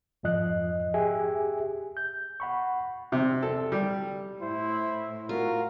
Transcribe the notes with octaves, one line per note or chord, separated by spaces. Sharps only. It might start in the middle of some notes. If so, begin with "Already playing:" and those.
F2 G#2 F3 D#5 F#6
G4 G#4 E5 G#5
G6
F#5 B5 C#6
C3
A4
G3
A2 E4 C5
F4 F#4 A#4